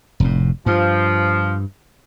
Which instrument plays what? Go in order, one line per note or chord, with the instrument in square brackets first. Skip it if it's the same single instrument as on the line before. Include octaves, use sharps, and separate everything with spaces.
[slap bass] F1 A2
[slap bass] G2 [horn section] F3